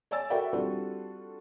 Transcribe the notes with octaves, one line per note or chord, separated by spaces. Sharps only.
C#5 D5 G#5 E6 A6
F#4 A4 A#4 D5 E5 G5
G3 C4 D4 F4 F#4 A4